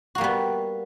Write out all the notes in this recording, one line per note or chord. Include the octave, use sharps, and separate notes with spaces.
G3 A#3 B3 F#4